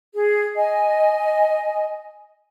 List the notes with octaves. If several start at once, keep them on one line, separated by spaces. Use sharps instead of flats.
G#4
D#5 G#5